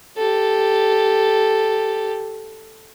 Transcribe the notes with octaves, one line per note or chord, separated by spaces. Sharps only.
G4 A4